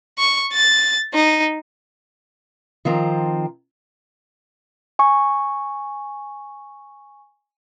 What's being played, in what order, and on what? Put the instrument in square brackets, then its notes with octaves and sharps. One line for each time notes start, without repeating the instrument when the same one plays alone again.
[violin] C#6
A6
D#4
[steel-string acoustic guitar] D#3 F3 C4 A#5
[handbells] G#5 C#6